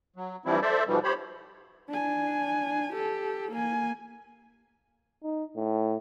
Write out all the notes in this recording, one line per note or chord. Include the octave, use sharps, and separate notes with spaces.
F#3
G2 E3 F3 G3 C4 E4
A4 C5 D5 E5
G#2 B2 E3 F3 G3
G4 C5 C#5 B5
D4 G#5
G4 A4
A#3 G#5
D#4
A2